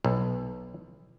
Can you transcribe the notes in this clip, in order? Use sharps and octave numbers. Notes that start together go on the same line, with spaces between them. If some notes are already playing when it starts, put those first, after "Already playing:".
B1